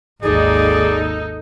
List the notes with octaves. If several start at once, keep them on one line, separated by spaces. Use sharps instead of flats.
G#1 D#2 D#4 G#4 A4 D5